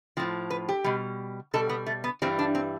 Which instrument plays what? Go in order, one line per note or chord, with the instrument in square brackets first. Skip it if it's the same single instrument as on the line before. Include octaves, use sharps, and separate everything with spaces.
[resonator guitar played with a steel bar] A2 F3 C4
B4
G4
B2 G3
B2 G3 A4
B3
A3
B3
G2 E3 G3 C4
D4
C4